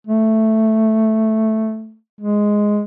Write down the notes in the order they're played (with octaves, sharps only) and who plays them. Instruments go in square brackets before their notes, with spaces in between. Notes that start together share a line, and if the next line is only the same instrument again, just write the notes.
[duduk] A3
G#3